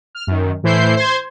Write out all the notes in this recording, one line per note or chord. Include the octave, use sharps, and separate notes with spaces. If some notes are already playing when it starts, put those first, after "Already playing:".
F6
F#2 D#3
A2 E3 E4 C5 G6 C7
C5 C6 G#6